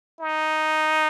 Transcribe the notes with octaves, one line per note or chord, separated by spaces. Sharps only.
D#4